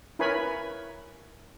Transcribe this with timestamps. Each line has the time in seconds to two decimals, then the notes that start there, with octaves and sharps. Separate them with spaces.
0.19 E4 A#4 B4 C#5 G#5 B5